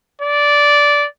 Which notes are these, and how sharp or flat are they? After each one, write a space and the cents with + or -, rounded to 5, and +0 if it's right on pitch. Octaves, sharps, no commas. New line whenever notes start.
D5 -10